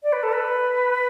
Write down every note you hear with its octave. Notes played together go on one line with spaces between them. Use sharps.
D5
B4
A4
B4